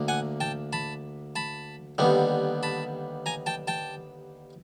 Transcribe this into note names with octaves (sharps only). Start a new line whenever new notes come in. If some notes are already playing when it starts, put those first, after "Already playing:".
Already playing: D2 D3 A#3
F#5 G#5
G5 A5
A5 B5
A5 B5
D#2 D3 G3 B3
A5 B5
G#5 A#5
G5 A5
G5 A5